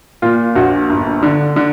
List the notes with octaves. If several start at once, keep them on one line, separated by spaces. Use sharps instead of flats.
A#2 F4
A#1 F#4
G1
D3
D3